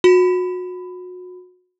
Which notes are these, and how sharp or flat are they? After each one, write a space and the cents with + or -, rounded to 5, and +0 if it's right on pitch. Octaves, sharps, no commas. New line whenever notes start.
F#4 -30 B5 +20